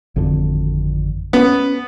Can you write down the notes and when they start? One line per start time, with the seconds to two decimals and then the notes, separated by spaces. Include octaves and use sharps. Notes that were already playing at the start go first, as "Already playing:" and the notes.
0.16 G#1 F2 D3
1.33 B3 C#4